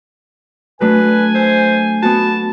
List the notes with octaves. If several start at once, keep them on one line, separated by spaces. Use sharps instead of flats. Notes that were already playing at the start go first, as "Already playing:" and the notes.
F#3 A3 D4 B4 G#5
C5 E5
B3 F#4 A5